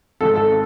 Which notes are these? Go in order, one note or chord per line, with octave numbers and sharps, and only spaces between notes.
G#1 G#2 D#3 A4
A4